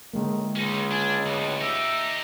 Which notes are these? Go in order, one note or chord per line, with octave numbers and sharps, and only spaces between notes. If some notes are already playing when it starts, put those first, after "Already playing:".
C#2 A2 D3 D#3 G#3 A#3
C#2 C#4 D#4
D4 G#5
D2 B3
D#4 G4 E5